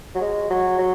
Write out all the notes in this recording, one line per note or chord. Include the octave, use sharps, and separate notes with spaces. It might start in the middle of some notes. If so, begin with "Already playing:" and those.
F#3
G#3
F#3
F#3